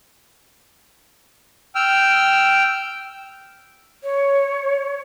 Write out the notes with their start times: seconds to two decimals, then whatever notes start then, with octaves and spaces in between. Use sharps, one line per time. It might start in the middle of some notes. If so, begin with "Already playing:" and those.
1.75 G5 E6 F6
4.04 C#5